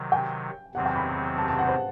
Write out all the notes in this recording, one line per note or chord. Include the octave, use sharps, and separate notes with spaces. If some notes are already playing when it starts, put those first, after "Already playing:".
Already playing: C3 D#3 F#3
G5
E2 C3 D#3 F#3 C4 F#5
G5
B5
A5
A5
F#5
C5